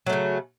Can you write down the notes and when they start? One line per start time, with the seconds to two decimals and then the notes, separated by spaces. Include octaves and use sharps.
0.06 F#3
0.10 A3
0.13 C#3